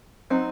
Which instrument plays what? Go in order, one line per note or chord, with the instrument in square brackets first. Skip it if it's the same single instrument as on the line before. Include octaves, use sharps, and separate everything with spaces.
[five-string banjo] F#3 C4 D#4